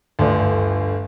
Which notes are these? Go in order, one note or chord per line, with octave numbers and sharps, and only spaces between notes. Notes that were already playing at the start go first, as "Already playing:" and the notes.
G1 D2